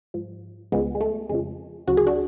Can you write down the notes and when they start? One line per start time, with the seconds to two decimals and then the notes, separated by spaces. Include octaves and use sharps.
0.14 G#2 F3
0.72 C#2 C#3 F3 G#3 B3
0.95 G#3
1.01 A3
1.29 F2 C#3 F3 G#3
1.87 D2 C#3 F#3 F#4
1.97 G#4
2.07 D4 F#4